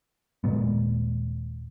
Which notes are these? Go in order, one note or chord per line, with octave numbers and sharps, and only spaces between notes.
D#1 A#2 G#3 B3